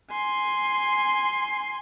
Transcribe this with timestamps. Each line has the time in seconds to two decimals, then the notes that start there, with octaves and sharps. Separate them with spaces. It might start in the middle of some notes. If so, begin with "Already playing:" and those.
0.11 G#5 C6